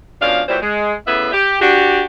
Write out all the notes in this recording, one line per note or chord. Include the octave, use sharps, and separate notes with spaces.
B2 F3 C#4 D4 F5
A#2 E3 F#3 G3 G4 C5
G#3
A2 C#3 B3 E5
G4
D4 F#4 G4